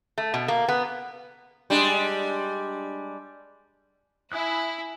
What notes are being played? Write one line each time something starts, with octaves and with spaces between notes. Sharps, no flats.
A3
B2
A#3
B3
G3 G#3 D4
E4 G#5 D#6 F#6